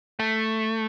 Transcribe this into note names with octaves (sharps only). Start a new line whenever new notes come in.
A3